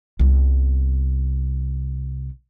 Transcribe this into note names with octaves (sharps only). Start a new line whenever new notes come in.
C2 B3